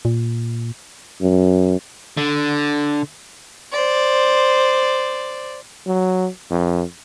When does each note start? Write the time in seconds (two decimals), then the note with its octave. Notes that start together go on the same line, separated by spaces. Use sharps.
0.05 A#2
1.21 F#2
2.17 D3
3.72 C5 D5
5.87 F#3
6.51 F2